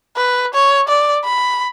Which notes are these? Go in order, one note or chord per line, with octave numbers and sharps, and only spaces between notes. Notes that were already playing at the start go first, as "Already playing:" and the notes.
B4
C#5
D5
B5